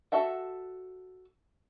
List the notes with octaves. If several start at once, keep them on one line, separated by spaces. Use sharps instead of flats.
F#4 A4 E5 F#5